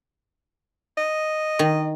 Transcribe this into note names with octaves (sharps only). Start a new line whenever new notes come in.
D#5
D#3